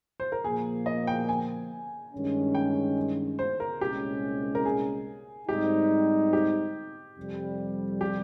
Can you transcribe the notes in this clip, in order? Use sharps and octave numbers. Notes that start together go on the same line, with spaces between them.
C5
A#4
A#2 F3 A#3 G#4
D#5
G5
G#5
G2 D#3 G#3 C#4
G5
C5
A#4
C2 A#2 G#3 C#4 G4
A#4
G#4
G#2 G3 C4 D#4 G4
G4
F2 C3 G3
G4